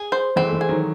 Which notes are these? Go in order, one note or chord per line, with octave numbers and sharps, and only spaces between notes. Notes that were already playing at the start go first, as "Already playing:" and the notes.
Already playing: G#4
C5
E3 G#3 C4
A3
E3 G#3
G#4
D#3 F#3